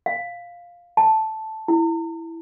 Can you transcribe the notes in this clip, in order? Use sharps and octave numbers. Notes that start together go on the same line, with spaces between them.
F5
A5
E4